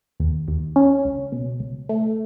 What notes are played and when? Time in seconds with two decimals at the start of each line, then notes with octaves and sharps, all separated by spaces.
0.20 D#2
0.48 D#2
0.76 C#4
1.05 C#2
1.32 B2
1.60 C#2
1.89 A3